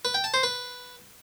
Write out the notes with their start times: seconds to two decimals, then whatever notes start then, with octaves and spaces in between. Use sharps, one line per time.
0.05 B4
0.14 G5
0.24 A5
0.34 C5
0.43 B4